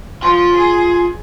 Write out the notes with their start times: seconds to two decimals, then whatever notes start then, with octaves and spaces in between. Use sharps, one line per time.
0.23 F3 F4 C6
0.55 G#4